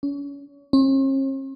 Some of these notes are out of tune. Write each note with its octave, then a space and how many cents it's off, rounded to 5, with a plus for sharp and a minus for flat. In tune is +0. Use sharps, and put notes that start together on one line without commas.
C#4 +35
C#4 -45